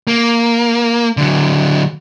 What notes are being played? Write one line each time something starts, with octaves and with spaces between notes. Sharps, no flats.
A#3
D3 F#3